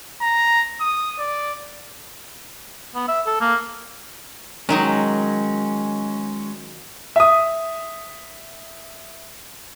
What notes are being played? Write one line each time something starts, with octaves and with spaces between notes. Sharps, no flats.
A#5
D#6
D5
B3
E5
A4
A#3
D#3 F#3 G#3 C#4 D#4
E5 D#6